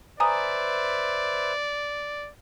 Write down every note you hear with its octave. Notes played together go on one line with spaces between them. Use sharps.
B4 C5 D5 E5 G#5 A#5 D#6